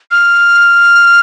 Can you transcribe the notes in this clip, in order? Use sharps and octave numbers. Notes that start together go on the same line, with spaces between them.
F6